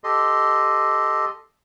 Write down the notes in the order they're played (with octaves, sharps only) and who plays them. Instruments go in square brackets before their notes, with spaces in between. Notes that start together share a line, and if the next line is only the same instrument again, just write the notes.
[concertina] G4 A4 D#5 C6